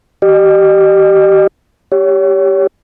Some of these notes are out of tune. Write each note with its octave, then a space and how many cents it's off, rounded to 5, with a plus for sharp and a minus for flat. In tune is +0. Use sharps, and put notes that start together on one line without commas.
G4 -25 D#5 -40
G4 +0 C#5 +25